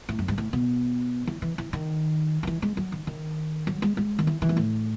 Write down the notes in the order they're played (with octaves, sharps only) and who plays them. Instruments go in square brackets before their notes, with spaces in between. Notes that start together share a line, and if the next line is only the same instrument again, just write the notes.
[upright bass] A2
F#2
G#2
A2
B2
E3
E3
E3
D#3
D#3
E3
G#3
F#3
D#3
D#3
F#3
G#3
G#3
D#3
E3
E3
G#2
A2